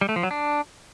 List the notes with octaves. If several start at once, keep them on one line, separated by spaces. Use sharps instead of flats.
G3
A3
F3
F#3
D4